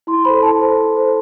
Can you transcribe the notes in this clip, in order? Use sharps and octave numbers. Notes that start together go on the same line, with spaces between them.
E4 C6
A4 C5 B5
E4 A5
A4 C5
E4
A4 C5